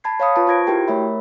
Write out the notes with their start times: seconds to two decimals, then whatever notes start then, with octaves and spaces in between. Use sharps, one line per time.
0.04 A5 B5 G#6 C7
0.20 C#5 F5 B5 D#6 C#7
0.35 F4 B4 A5 C#6
0.47 F4 C5 G#6 A#6 D7
0.67 E4 F#4 G4 A#4 G5
0.88 A3 A#4 C#5 E5 B5